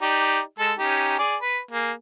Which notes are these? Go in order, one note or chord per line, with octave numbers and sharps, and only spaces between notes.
D#4 G4 D5
G#3 A4 E6
C#4 D#4 G4
G#4 D5
B4
A#3 G#4